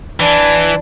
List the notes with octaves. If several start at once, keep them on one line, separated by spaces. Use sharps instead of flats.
E3 D4